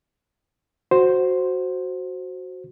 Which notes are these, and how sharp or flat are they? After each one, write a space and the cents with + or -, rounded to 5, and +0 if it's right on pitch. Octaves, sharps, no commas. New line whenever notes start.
F#4 +0 C5 +0